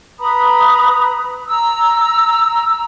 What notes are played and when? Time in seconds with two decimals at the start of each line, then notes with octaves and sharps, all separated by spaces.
0.20 B4 A#5 B5 D#6
1.47 A#5 E6